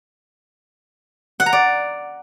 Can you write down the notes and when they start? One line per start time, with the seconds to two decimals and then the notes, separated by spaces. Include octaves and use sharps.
1.40 F#5
1.46 A#5
1.53 D5